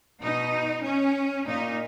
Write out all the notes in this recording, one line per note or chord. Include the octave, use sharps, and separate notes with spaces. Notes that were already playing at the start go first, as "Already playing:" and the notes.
B2 D#4
C#4
A#2 D#4